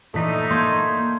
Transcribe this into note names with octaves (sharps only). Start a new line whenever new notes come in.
A#2 E3 A3 D4 D#4 A4 B6
A#3 C6 G6 G#6